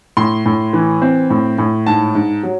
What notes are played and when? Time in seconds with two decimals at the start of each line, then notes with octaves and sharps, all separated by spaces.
0.17 A2 C6
0.46 A2
0.73 E3
1.02 C4
1.30 A2
1.58 A2
1.87 G#2 A5
2.15 G#2
2.43 F#3